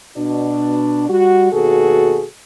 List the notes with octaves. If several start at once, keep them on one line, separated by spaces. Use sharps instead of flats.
B2 D4
G3 F#4
D#2 B2 F#4 G#4 A4